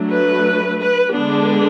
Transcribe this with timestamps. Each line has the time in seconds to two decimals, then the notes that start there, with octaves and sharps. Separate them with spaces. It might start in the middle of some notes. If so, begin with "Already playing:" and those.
Already playing: F#3 A3 D4
0.11 B4
0.79 B4
1.14 D3 G#3 B3 D4